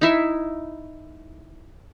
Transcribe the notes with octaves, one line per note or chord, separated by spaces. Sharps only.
D#4 E4 E5